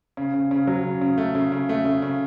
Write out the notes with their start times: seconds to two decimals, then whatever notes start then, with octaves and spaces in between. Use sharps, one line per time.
0.17 C#3
0.34 C#3
0.51 C#3
0.67 F#3
0.84 C#3
1.01 C#3
1.18 A3
1.35 C#3
1.52 C#3
1.69 A3
1.85 C#3
2.02 C#3